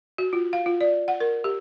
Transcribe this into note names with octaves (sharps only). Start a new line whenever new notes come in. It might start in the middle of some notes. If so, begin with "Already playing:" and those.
F#4
F4
F5
F4
D5
F#5
A#4
G4